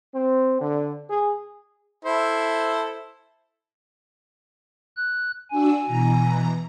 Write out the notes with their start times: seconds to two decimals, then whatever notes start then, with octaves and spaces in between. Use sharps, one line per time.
0.15 C4
0.61 D3
1.10 G#4
2.05 E4 A4 C5
4.97 F#6
5.51 D4 F#4 G#5 E6
5.85 B2 E3 A#5